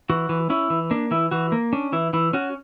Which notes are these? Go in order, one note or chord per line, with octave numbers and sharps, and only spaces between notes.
E3 F#4
E3
C#4 E4
E3
A#3 D4
E3 E4
E3 F#4
A#3
C#4 D4
E3 E4
E3 E4
C#4 F#4